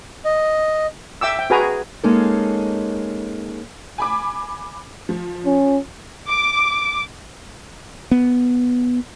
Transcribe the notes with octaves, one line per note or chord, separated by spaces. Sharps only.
D#5
E5 G5 D6 E6
G5
F#4 G#4 B4 G#5 A#5
G#3 A#3 C#4 D#4 A4
G#5 B5 D6
F3
C#4
D6
B3